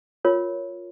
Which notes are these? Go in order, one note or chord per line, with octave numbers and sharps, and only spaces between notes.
F4 A#4 C#5